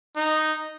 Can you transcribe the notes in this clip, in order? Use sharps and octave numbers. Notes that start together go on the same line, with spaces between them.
D#4